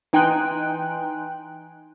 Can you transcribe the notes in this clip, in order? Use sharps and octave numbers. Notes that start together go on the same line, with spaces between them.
E3 D#4 G5 G#5 C6 F#6